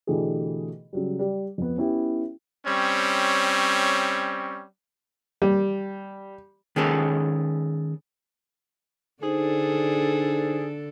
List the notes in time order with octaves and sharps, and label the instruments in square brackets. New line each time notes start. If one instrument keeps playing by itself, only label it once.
[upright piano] B2 D3 E3 A3 G4 G#4
C#3 F#3 G3
G3
F2 B3
B3 C#4 E4 G4
[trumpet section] G3 C4 C#4 C#5
[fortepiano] G3
[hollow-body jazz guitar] D#3 G#3 C#4 G#4 A4 B4
[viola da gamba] D3 D4 A4 [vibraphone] D#4 C5 [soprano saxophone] G#4